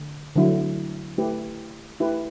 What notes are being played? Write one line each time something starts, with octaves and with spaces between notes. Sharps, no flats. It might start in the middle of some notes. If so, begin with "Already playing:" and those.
Already playing: D3
D3 F#3 A3 E4
A3 E4 G4 B4
A3 E4 G4 B4